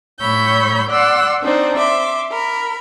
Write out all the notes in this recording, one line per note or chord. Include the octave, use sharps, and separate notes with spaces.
A2 C#5 B5 E6 G6
D5 F#5 C6 E6 F#6
C4 D4 D#4 C5
E5 C6 D6
A#4 B5